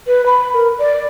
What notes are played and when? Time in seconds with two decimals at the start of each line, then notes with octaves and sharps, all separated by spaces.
0.07 B4
0.26 B5
0.54 A#4
0.79 D5